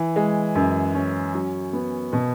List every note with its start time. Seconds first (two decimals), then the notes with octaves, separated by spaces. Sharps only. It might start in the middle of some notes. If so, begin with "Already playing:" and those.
Already playing: E3
0.16 G#3
0.55 F#2
0.94 C#4
1.34 F#3
1.73 B3
2.13 B2